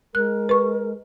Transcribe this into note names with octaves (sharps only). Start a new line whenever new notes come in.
G#3 A#4 F#6
B4 C#6